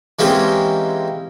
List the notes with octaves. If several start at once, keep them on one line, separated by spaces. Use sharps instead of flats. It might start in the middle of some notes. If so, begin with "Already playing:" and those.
E3 G#3 A#3 C4 C#4 G4